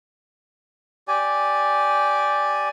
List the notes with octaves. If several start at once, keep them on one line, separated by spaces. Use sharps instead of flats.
G4 D5 G#5